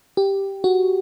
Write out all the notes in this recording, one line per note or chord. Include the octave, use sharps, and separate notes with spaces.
G4
F#4